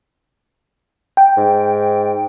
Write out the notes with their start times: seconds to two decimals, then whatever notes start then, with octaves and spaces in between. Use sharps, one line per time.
1.17 G5
1.37 G#2